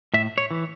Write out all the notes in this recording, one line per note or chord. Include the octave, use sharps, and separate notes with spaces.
A2 E5
C#5
E3